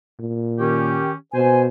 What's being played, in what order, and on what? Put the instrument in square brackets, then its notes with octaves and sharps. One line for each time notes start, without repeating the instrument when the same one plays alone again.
[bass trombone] A#2
[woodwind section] D#3 C#4 G4
[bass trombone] B2 [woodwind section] C5 G#5